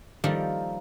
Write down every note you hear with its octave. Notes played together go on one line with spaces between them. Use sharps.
D#3 F3 G3 A#3 A4